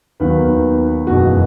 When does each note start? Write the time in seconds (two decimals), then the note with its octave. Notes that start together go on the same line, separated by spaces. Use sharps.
0.20 D#2 D#3 F#3 B3 B4
1.07 F#1 E2 B2 G#3 F#4